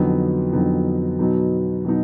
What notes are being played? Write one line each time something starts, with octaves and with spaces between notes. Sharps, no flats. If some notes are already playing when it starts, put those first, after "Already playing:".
Already playing: F2 D3 F#3 B3 D#4
F2 D3 F#3 B3 D#4
B2 F#3 B3 D#4
B2 F#3 B3 D#4